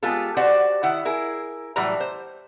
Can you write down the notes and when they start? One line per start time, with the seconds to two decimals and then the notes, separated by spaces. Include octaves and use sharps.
0.03 G#3 B3 F4 G4 A4
0.37 F#4 G4 C5 D5 F#5
0.83 D#3 E4 F#5
1.05 E4 G#4 A#4
1.76 A2 E3 F#3 G3 A#5
2.00 C5